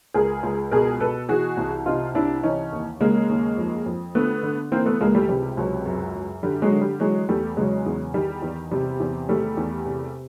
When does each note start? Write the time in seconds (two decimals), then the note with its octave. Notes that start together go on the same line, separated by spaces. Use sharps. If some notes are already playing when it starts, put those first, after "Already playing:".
0.14 C#2 G#4 A#4
0.43 C#2
0.71 B2 G#4 A#4
1.00 B2 A4 B4
1.29 E3 F#4 G#4
1.57 C2
1.86 C3 D#4 F4
2.15 C2 D4 E4
2.43 E3 C#4 D#4
2.72 D#2
3.00 C#3 G#3 A#3
3.29 D#2
3.58 F2
3.86 F2
4.15 D3 A3 B3
4.43 D3
4.72 E3 A#3 C4
4.86 A3 B3
5.01 C#2 G#3 A#3
5.15 G3 A3
5.29 C3 G3
5.57 C#2 F#3
5.86 F#2
6.15 F#2
6.43 D3 G3
6.62 F#3 G#3
6.72 D3
6.81 G3
7.00 E3 F#3 G#3
7.29 E2 G3 A3
7.57 C#3 F#3 G#3
7.86 E2
8.14 D#3 G3
8.42 E2
8.71 C3 G3
9.00 E2
9.29 D#3 G3 A3
9.57 E2
9.86 C3